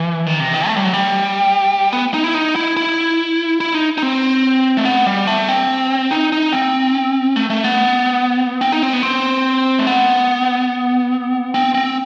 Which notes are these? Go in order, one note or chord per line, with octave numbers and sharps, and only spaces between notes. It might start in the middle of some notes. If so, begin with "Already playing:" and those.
Already playing: E3
D#3
C3
D#3
A3
G3
F#3
G3
B3
D#4
E4
D#4
E4
E4
E4
D#4
D#4
C4
A3
B3
G3
A3
C4
D#4
D#4
C4
A3
A3
B3
C4
D#4
C4
B3
C4
A3
B3
C4
C4